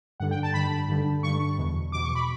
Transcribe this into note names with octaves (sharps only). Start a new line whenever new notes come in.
G2 D3 F#5
G5
A5
G2 D3 B5
G2 D3
G2 D3 C#6
E2 B2
E2 B2 D6
C#6
B5